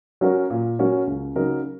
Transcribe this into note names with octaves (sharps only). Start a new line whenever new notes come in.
F#3 C#4 F#4 A#4
A#2
F#3 C#4 F#4 A#4
C#2
C#3 F#3 D#4 A#4